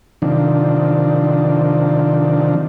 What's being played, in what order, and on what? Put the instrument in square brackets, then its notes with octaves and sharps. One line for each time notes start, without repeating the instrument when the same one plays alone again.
[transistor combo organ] C3 D#3 F3 D4